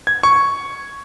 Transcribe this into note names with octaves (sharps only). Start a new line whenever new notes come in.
G#6
C#6